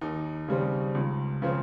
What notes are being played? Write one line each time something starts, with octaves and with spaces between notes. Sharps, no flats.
D#2 D#4
C#3 G3 C4
C#2
C#3 F3 C4